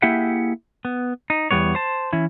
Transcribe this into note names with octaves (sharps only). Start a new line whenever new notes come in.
A#3 E4 G4 G#4 E5 F#5
B3
D#4
E2 G3 B3 C#5
C5 A5
E3 C#4 E4